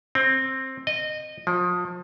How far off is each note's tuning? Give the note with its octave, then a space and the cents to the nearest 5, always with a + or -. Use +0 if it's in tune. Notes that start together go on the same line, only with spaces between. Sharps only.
C4 +15
D#5 -20
F3 +30